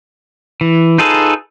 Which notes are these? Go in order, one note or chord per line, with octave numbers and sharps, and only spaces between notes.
E3
D#4 F4 G#4 A4 B4